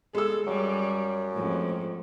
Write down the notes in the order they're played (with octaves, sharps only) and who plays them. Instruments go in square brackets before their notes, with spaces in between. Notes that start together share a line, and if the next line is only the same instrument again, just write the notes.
[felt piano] G#3 E6 [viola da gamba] A4
[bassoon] F#2 [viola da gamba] G3
[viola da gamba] F2 G#2 A3